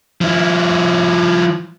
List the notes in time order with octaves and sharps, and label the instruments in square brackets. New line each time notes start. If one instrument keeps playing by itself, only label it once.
[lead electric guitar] F3 E4